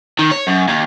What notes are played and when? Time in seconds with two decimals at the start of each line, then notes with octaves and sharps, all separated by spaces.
0.19 D#3
0.31 C#5
0.47 F#2
0.68 D#2